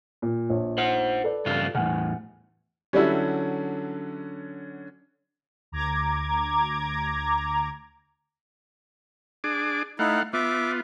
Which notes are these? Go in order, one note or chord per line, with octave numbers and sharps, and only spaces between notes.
A#2
A#1 C#5
C5 F#5
A4 B4 D5
G2 C#3 F4
E2 A2 C#3 F#5 G#5
D3 F#3 G3 C#4 E4
D2 A#5 D6 G#6
D4 G#4 D6
A3 D#4 E4 F5 F#5
B3 F4 E5 D6